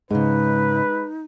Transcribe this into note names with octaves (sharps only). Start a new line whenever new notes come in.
G#2 C#3 G#3 D#4 B4